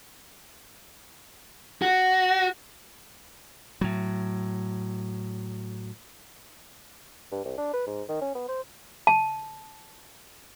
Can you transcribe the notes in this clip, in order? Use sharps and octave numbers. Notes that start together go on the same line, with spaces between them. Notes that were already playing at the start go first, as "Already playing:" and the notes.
F#4
A2 F#3
G2
C2
D4
B4
G#2
D#3
C#4
B3
C5
A5